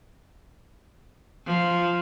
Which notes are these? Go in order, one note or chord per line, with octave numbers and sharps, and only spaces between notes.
F3